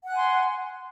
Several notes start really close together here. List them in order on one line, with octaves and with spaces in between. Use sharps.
F#5 F#6 G#5 C6